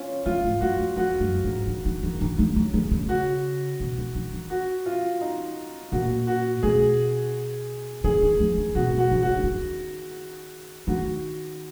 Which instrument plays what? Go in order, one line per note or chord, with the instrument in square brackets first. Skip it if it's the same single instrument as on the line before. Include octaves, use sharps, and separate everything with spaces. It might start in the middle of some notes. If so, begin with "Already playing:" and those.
Already playing: [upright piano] C#4 F4
[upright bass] C#3 [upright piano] F4
[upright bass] G#2
[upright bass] F#2 [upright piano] F#4
[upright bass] F2
[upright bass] F2 [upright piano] F#4
[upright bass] F#2
G#2
D#3
D#3
D#3
D#3
D#3
C#3
C#3
C#3
[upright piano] F#4
[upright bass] B2
D#3
D#3
D#3
[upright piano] F#4
F4
D#4
[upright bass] A#2 [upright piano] F#4
[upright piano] F#4
[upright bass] B2 [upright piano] G#4
[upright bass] C#3 [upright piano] G#4
[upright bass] D#3
F3
D#3
[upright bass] B2 [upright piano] F#4
[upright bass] B2
[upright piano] F#4
[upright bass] C#3
[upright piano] F#4
[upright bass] F3
D#3
C#3
D#3
[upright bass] D#3 [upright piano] F#4